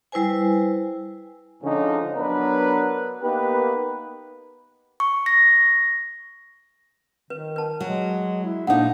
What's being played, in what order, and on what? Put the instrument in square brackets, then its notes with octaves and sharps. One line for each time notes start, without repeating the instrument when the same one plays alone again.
[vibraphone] G3 E4 B4 C5 G#5
[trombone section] G#2 D3 F3 C#4 D#4
F#3 B3 D4 A#4 B4
A#3 B3 D#4 G4 B4
[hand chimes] C#6
A#6
[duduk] D#3 [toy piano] B4
[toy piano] B4 A5
[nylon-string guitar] F#3 [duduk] G#3
[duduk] E4
[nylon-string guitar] A#2 D#4 [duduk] D4 [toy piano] A4 F#5